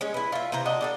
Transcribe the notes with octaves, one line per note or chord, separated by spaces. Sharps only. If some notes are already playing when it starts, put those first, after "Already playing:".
G#3 C#4
E4 B4
F4 E5
C3 E3 C5 A#5
D4 F#4 D#5
D4 G#4 A4